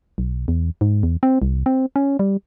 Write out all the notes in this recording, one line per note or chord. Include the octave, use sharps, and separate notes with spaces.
B1
E2
G#2
E2
C4
C2
C4
C#4
G3